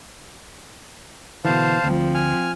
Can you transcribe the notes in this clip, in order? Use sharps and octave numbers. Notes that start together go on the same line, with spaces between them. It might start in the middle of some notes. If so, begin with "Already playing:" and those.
B2 D3 E3 C5 F5 A5
D2 F3 C4
G#5 F6